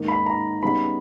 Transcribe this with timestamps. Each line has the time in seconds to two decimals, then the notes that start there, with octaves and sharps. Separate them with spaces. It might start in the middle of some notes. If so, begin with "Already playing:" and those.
Already playing: G#2 D#3 A#3 D#4
0.08 B5
0.26 A#5
0.63 C#3 G3 B3 D#4 B5